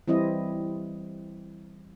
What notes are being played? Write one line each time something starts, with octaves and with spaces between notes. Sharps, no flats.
E3 G3 C4 E4 D#5